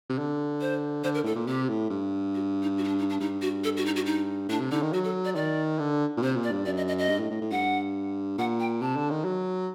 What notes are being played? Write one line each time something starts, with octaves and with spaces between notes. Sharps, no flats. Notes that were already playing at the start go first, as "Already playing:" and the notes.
C3
D3
C5
D3 C5
A#4
A2 A4
A#2
C3 G4
A2
G2
F#4
D#4
F#4
D#4
D4
D#4
D4
G2 D#4
F#4
A4
F#4
D#4
F#4
D#4
A2 D4
C3
D3 D#4
D#3
F#3 F#4
A4
D5
D#3 D5
D3
A#2
C3 C5
A#2
D5
G2
F#2 D5
D#5
D#5
D#5
G2
A2
A2
A2
G2 F#5
A#2 F#5
G5
C3 A5
D3
D#3
F#3